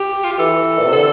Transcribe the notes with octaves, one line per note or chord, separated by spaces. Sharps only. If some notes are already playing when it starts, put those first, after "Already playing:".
Already playing: G4
F4
G4
E3 A4
A#2
C3
D3 A4